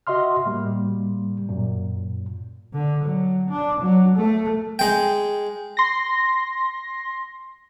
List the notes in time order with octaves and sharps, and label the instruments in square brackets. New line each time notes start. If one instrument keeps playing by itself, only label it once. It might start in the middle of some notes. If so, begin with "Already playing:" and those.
[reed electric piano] F#4 D#5 E5 C6 F6
A2 G3 A#3
F#2 A#2
[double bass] D3
F#3
D4
F#3
A3
[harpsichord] G#3 G5
[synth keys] C6 A#6